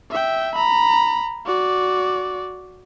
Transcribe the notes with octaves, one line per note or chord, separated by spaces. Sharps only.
E5 G5
A#5 B5
F#4 D5